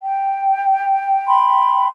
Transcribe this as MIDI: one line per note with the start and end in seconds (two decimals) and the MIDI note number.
0.02 1.85 79
1.26 1.87 83
1.26 1.87 84